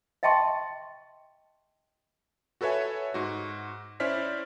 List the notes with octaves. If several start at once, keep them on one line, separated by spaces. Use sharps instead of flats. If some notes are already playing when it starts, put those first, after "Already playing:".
D#5 E5 G5 A5 C6 C#6
F#4 A4 B4 C#5 E5 G#5
G#2 F#4
C#4 E4 C5 D5 F6 B6